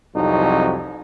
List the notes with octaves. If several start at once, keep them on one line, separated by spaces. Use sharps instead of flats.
C2 F2 F#3 D#4